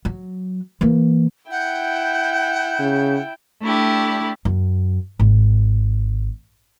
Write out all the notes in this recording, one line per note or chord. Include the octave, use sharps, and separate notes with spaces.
F#3
E3 A#3
E4 F#5 G5 G6
C#3
A3 D4 E4 G4
F#2
G#1